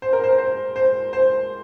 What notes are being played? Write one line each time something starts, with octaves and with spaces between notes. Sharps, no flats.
C5
A#4
C5
C5
C5
C5